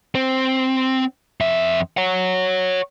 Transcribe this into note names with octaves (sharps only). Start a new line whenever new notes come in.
C4
F2 E5
C#5 F#5